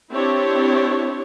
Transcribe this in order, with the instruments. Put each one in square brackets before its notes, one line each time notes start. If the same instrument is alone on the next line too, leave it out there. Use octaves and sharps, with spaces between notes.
[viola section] C4 D4 E4 G4 C#5